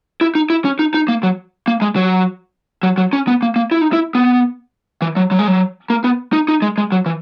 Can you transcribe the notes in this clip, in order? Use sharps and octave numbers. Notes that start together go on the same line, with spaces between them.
E4
D#4
E4
C#4
D#4
D#4
A#3
F#3
A#3
G#3
F#3
F#3
F#3
C#4
B3
A#3
A#3
E4
D#4
E4
B3
E3
F#3
F#3
G#3
F#3
A#3
B3
D#4
D#4
G#3
G#3
F#3
E3